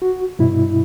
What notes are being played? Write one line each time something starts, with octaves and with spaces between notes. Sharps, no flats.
F#4
G2 B2 E4